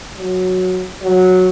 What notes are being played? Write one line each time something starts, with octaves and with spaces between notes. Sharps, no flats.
F#3
F#3